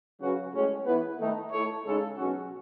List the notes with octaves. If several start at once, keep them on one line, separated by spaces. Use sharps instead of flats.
C#3 F#3 C#4 F#4 B4
A2 G#3 C#4
E3 B3 E4 B4
D#3 A3 D#4
A3 E4 A4 C#5
C#3 G#3 D#4 A4
B2 F#3 C#4 F#4